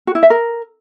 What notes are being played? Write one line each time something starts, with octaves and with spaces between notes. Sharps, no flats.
F#4
E4
E5
A#4